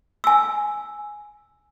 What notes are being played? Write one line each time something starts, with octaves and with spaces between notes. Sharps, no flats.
G#5 E6